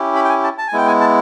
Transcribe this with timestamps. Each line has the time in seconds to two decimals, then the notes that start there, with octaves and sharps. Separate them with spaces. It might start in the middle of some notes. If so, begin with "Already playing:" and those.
Already playing: C#4 E4 G4
0.15 B5
0.24 G5
0.29 G#5
0.44 A5
0.58 A5
0.68 G#5
0.73 G#3 B3 E4 G5
0.87 G#5
1.01 A5